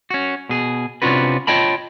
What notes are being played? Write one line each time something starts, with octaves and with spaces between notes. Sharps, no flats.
C#4 F#4
B2 G#4
C3 C#4 D4 F4 F#4 B4
F4 C#5 D#5 G5 A5 B5